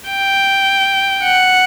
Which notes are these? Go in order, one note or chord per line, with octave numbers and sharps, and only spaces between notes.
G5
F#5